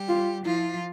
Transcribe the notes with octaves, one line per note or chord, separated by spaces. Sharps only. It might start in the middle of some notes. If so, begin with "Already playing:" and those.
Already playing: G3 G4
F4
F3 E4 F4